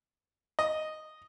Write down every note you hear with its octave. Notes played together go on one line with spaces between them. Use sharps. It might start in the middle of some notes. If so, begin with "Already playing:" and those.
D#5